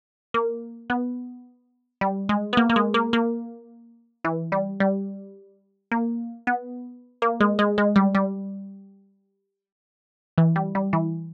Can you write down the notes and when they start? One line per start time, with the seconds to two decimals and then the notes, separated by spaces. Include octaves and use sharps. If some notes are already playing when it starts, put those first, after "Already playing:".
0.34 A#3
0.90 B3
2.01 G3
2.29 G#3
2.53 B3
2.57 A#3
2.70 A#3
2.76 G#3
2.94 A#3
3.13 A#3
4.24 E3
4.52 G3
4.80 G3
5.92 A#3
6.47 B3
7.22 A#3
7.40 G#3
7.59 G#3
7.78 G#3
7.96 G3
8.15 G3
10.38 E3
10.56 G3
10.75 G3
10.93 E3